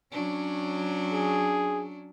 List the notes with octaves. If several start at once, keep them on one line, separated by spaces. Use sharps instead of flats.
F#3 C#4 D4
G#4